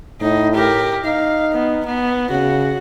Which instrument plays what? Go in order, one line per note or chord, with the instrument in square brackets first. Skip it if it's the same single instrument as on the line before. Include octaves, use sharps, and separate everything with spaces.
[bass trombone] A2 [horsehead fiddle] D#4
[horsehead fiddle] G4 A#4
[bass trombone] D#4 [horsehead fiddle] F5
[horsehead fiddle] B3
B3
[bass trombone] C#3 [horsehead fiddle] F#4